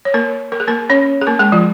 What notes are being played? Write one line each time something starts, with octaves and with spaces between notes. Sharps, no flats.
C#5
A#3 A#4
A#4
G#4
A#3 A#4
C#4 C#5
G#4
A#3 A#4
G#3 G#4
F3 F4